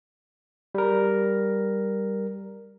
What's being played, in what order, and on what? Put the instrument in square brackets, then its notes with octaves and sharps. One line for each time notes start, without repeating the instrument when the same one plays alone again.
[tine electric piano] G3 A#4